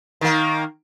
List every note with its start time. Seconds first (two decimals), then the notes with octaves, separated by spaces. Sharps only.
0.21 D#3 A#3